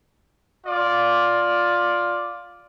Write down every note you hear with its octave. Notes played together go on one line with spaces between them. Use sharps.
F4 D5